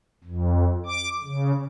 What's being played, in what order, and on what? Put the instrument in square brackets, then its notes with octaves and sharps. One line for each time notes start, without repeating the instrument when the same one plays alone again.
[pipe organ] F2
D6
C#3